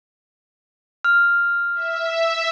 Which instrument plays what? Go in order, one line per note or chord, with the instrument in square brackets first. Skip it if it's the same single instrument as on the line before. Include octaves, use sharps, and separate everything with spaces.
[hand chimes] F6
[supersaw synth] E5